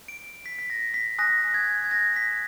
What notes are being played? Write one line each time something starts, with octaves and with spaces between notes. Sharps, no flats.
D7
B6
B6
A#6
B6
G#5 D#6 F#6 A#6
G#6
G#6
A#6
B6